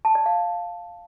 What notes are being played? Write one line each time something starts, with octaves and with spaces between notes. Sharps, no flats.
A5
D5
F5